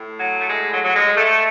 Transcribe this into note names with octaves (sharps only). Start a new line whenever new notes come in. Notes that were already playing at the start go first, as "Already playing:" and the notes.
Already playing: A2
F#3
A3
G#3
F#3
F#3
G#3
A3